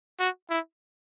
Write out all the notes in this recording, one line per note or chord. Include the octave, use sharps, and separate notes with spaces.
F#4
E4